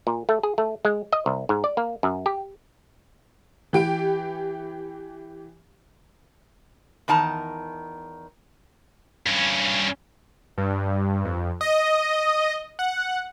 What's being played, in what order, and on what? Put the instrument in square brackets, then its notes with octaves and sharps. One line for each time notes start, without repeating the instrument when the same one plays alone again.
[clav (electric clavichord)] A#2
A3
G#4
A3
G#3
D#5
C2
G#2
D5
A#3
F#2
G4
[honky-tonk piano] E3 G4 D7
[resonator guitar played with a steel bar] E2 D#3 A5 A#5
[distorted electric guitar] G2 C#4
[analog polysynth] G2
F2
D#5
F#5